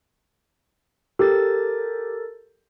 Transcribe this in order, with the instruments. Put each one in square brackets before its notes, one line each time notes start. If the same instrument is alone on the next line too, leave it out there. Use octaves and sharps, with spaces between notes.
[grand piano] G4 [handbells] A4 A#4 A6